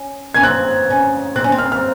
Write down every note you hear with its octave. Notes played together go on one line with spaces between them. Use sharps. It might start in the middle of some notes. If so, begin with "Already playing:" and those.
Already playing: C#4
C#4 G#6
C4 F#6
C#4
C4 F#6
C#4
C4
F6
F6